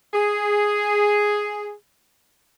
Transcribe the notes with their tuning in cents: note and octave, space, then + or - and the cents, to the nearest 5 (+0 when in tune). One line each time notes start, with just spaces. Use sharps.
G#4 +0